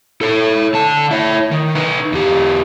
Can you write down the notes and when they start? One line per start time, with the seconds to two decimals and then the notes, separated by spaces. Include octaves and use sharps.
0.21 A4 C#5
0.74 D3 A5
1.11 E4 C#5
1.51 D#3
1.75 D#4 B4
2.12 E2 G4